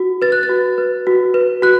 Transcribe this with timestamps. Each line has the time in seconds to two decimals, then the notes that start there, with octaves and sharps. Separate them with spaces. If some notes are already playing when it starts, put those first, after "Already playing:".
Already playing: F#4
0.22 B4 A6
0.32 F#6
0.43 A6
0.49 F#4
0.78 B4
1.07 F#4
1.34 B4
1.62 F#4 F#6